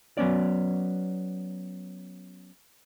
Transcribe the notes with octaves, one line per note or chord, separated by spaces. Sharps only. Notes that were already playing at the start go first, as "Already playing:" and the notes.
F#3 B3 C#4 D5